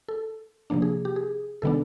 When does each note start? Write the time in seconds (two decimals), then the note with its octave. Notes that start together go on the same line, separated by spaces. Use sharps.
0.09 A4
0.70 C3 F3 A#3 D4
0.82 G#4
1.05 G4
1.16 G#4
1.62 C3 D#3 G#3 B3 D4 A4